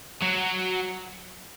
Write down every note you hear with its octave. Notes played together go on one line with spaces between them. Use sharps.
F#3